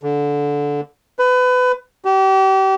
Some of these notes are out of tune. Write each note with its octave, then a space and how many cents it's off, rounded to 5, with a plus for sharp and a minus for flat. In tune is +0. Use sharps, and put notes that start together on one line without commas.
D3 -15
B4 +25
G4 -35